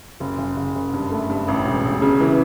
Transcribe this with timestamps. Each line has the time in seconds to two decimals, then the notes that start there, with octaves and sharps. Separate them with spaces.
0.20 F#1
0.38 F#1
0.57 F#1
0.75 F#1
0.93 G2
1.12 A3
1.30 G2
1.48 A1
1.66 E1
1.83 E1
2.02 C#3
2.21 E3